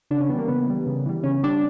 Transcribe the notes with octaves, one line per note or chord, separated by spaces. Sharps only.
C#3 D4
C#4
E3 G3 B3
A#3
C#3 B3
E3 G3
C#3
E3 G3
C#3 C#4
G3 D4